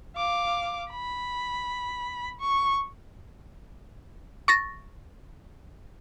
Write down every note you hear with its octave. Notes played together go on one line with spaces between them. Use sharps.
F5 D6
B5
C#6
C#6 A6 A#6